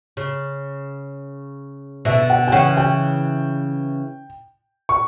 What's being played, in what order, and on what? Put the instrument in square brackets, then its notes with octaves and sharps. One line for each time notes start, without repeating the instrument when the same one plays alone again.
[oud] C#3
[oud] B2 D3 [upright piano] E5
[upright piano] F#5
G5
[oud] C#3 E3 [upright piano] F#5
[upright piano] G5
C#6